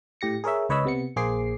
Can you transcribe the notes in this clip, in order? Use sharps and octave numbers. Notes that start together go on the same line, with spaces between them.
A2 G4 A#6 C#7
G#4 A#4 C#5 E5
C#2 B4 C#5 D#5 B5 E6
C3 B3 C#7
A#1 A#3 G#4 C5 D6 C7